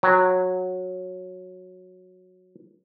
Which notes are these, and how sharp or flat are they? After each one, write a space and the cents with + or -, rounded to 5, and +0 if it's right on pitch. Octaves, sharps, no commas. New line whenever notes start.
F#3 -10 G5 +0